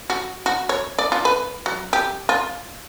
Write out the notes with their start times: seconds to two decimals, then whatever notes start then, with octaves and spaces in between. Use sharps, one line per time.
0.10 F#4
0.46 F#4
0.69 C#5
0.98 D5
1.12 F4
1.25 B4
1.66 F#3
1.93 G4
2.29 F4